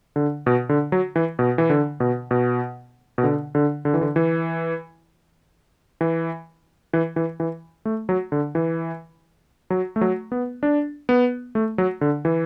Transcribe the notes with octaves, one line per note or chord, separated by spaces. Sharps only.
D3
B2
D3
F#3
E3
B2
E3
D3
B2
B2
B2
D3
D3
D3
E3
D3
E3
E3
E3
E3
E3
A3
F#3
D3
E3
F#3
A3
F#3
B3
D4
B3
A3
F#3
D3
E3